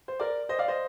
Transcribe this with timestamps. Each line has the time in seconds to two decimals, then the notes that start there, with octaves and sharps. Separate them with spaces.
0.08 C5
0.20 A#4 D5
0.49 C5 D#5
0.59 D5 F5
0.68 C5 D#5